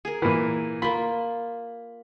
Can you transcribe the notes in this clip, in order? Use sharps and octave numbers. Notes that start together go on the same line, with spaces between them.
G#4 A#4
A#2 E3
A#3 F4 B5